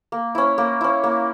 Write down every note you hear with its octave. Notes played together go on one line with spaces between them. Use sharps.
A#3
C#4 E4
A#3
C#4 E4
A#3